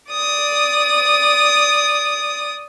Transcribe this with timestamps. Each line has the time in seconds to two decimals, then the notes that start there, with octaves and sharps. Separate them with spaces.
0.12 D5 D#6